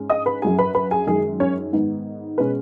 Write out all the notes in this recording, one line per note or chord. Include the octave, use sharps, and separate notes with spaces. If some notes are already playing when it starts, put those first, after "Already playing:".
Already playing: G#2 G#3 C#4
D#5 D#6
B4 B5
F#2 F#3 C#4 G#4 G#5
B4 B5
B4 B5
G#4 G#5
F#2 D#3 G#3 G#4
C#4 C#5
G#2 D#3 B3 D#4
B2 G#3 C#4 B4